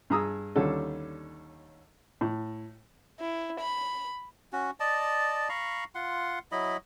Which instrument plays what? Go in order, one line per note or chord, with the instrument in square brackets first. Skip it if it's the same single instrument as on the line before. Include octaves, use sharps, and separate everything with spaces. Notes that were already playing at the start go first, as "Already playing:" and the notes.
[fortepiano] G2 G#4 A#5 D#6 E6
D#2 D3 G3 C#4 A4
A2
[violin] E4
B5
[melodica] C#4 F#4
D5 D#5 A5
F5 A#5 B5 C#6
F4 F#5 C6
F#3 E4 D#5 B5